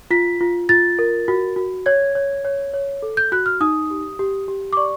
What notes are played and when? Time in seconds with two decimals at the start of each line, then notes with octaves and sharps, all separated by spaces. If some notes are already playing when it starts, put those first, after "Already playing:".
0.11 F4 B6
0.41 F4
0.69 F4 A6
0.99 A#4
1.28 F#4
1.56 F#4
1.86 C#5 G#6
2.15 C#5
2.45 C#5
2.74 C#5
3.02 A4
3.17 G6
3.32 F#4 F#6
3.46 F6
3.61 D#4 D#6
3.90 G4
4.19 G4
4.48 G4
4.73 D6
4.77 D5 C#6